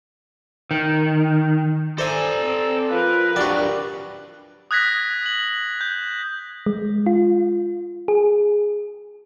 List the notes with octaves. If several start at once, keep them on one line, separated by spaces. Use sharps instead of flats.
D#3
A4 C5 D5 E5 G#5 A#5 E6
C4
F3 F4 A#4 B4
F#3 D4 F#4 G4 D5
D#6 F#6 G#6 A#6 B6
F#7
G6
G#3
F4
G#4